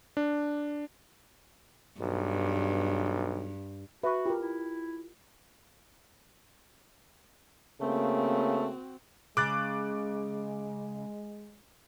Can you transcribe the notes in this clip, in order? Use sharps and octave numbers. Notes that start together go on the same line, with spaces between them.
D4
B1 G2
F#4 B4 E5 C#6
F4 G4 A#4
E4
C#3 A3 A#3 C4 F#4
C#3 G#3 D6 F#6 A6